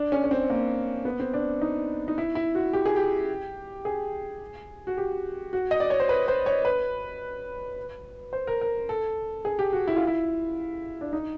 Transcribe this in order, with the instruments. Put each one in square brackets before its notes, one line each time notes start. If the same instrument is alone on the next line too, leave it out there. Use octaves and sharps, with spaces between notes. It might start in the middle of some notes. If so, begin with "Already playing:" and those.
Already playing: [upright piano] D4
C#4
C#4
C4
A#3
B3
C4
D4
D#4
D#4
E4
E4
F#4
G4
G#4
G4
G#4
F#4
G4
F#4
D#5
D5
C#5
C5
B4
C5
C#5
B4
C5
A#4
A#4
A4
G#4
G4
F#4
E4
F4
E4
D4
D#4